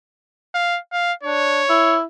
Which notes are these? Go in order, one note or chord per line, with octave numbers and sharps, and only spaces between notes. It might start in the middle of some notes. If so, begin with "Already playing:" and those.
F5
F5
D4 C#5
E4